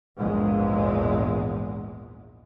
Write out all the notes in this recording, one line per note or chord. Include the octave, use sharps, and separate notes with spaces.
A#1 E2 G#2 G#3